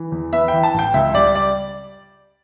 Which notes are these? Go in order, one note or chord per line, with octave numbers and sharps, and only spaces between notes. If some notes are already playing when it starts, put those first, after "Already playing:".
Already playing: E3
E2
B3 E5
E3 G5
A5
A1 G5
C#2 E5
G3 D5
D5